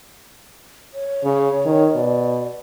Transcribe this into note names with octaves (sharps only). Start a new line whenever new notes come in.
C#5
C#3
D#3
B2 D5